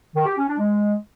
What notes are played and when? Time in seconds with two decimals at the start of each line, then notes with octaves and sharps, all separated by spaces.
0.14 D#3
0.25 G4
0.36 C#4
0.47 D4
0.58 G#3